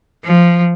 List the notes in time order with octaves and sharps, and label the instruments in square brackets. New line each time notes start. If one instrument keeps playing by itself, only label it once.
[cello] F3